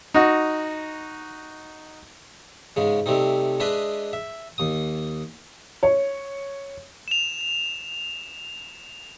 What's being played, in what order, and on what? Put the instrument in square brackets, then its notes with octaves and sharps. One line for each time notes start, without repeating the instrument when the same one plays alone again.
[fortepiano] D#4 F#4
[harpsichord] G#2 C#3 G#3
C3 G3 A3 C4 D#4
G#3 D4 G#4 B4 D#5 E5
E5
D#2 D#6
[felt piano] C#5
[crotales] E7 F7